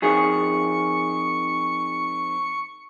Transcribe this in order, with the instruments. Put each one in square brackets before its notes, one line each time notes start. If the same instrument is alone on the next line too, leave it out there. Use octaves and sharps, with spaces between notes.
[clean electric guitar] F2 D#3 G#4 [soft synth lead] C#6